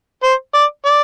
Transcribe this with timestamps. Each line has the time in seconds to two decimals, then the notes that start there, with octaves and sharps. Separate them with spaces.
0.23 C5
0.54 D5
0.86 D5